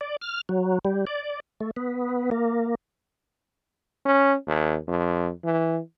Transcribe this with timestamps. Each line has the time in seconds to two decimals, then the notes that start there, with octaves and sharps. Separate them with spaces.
0.01 D5
0.21 F6
0.49 F#3
0.85 G3
1.07 D5
1.60 A3
1.76 B3
2.31 A#3
4.06 C#4
4.47 D#2
4.88 F2
5.44 E3